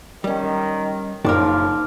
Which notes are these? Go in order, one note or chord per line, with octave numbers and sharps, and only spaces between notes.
D#3 G3 C#4
F#1 C#3 F3 D4 D#4 A#4 D6 F6